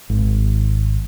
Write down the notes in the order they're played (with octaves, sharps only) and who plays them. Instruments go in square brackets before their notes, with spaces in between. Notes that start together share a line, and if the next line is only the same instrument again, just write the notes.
[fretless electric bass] G#1